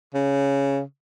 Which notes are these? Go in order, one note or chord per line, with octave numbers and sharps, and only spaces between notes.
C#3